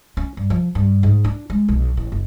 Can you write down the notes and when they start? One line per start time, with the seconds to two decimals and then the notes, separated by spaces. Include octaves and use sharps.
0.17 C#4
0.37 G2
0.50 F3
0.75 G2
1.03 G#2
1.24 D4
1.50 G#3
1.68 B1
1.97 A1
2.12 F#1